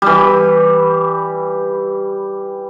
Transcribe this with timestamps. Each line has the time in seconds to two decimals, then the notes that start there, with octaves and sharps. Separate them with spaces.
0.02 E3 G3